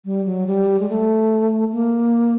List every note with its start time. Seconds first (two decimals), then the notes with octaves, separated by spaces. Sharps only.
0.05 G3
0.26 F#3
0.47 G3
0.79 G#3
0.89 A3
1.73 A#3